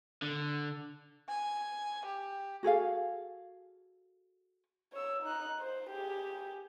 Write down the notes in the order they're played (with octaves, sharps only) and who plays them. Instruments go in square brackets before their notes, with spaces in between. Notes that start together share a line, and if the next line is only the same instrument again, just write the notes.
[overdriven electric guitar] D3
[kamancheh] G#5
G4
[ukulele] F#4 G#4 A4 F5
[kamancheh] C#5 E6
D#4 F#6
C5
G4 G#4